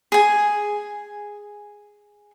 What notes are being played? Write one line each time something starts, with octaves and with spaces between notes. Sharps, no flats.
G#4 G#5